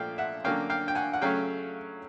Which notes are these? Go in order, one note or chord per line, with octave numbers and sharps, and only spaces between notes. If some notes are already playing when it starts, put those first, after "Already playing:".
Already playing: A#2 F3 A3 F5 G5
E5 F#5
D3 F#3 A#3 C#4 F5 G5
F5 G5
G5
F#5 G#5
F#5
C#3 F#3 A3 C#4 F5 G5